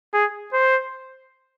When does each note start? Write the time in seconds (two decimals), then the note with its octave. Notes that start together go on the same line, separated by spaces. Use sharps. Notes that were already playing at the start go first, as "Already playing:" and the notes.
0.13 G#4
0.53 C5